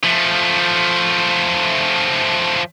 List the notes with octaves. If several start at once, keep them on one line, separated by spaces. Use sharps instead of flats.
F3 A3